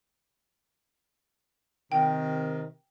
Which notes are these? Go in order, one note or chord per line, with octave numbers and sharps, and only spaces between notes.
C3 D#3 G5